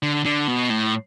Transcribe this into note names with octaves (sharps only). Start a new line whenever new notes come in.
D3
D3
B2
A2